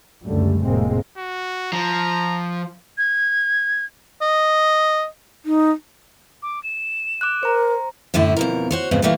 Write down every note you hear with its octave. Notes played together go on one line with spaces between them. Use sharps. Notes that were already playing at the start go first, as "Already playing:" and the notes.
C#2 F#2 D3 G3 A3
F1 A2 C3 G#3 A#3 C4
F#4
F3 A#5
G#6
D#5
D#4
D6
E7
D6 F#6
A#4 C5 A#5
F#2 A2 D3 A3 E4
F2 B2 A#4
F#4 C5 C#5
F2 G#2 C#3 B3 C4
A#2 D3 E3 G3 A3 A#3